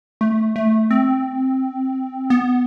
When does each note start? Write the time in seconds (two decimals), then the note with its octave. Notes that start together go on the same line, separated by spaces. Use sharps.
0.21 A3
0.56 A3
0.91 C4
2.30 B3